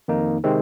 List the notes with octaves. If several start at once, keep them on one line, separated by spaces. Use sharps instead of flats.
F2 D#3 A#3 D#4
C3 D#3 G#3 C4